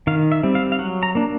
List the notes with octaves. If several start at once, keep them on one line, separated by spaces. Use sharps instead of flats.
D#3 F5
E5
G3 C4
F5
F5
F#3 F#5
A#5
A#3 D4